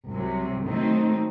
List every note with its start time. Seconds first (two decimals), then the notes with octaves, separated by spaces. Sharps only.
0.10 C2 C3 F#3
0.67 D#3 F#3 A3 C4 D#4